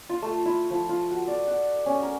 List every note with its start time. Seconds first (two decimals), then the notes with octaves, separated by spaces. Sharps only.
0.09 F4
0.22 A3
0.45 E4
0.71 F3
0.89 F4
1.11 F#4
1.27 D5
1.47 F#5
1.86 C#4
2.02 A#4